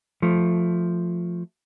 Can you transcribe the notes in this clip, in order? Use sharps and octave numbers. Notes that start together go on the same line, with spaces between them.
F3 A3